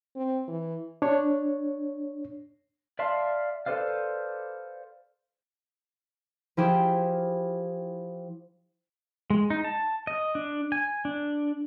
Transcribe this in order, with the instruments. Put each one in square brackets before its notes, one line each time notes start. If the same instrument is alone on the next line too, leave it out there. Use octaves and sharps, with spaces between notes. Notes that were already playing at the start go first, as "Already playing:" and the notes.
[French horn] C4
E3
[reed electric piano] D4 C#5
[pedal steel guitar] D5 E5 F5 A5 C6
A4 B4 C5 D5 F5
[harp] F3 E4 G4 G#4
[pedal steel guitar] G#3
D#4
A5
D#5
D4
G#5
D4